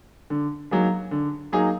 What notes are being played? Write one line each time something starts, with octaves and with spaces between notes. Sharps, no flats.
D3
F#3 A#3 D#4 G#4
D3
F#3 A#3 D#4 G#4